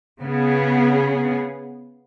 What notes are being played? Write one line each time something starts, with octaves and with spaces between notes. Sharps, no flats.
C#3 B3 G#4